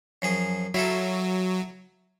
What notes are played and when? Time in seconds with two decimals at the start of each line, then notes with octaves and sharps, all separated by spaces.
0.22 F#2 F3 G#4
0.74 F#3 E4 F4 A4